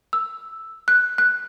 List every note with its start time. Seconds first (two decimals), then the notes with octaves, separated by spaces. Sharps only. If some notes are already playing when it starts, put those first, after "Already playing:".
0.13 E6
0.88 F#6
1.18 F#6